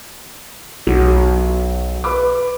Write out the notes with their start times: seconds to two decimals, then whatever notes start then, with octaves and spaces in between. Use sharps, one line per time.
0.87 B1 F#3
2.04 B4 B5 D6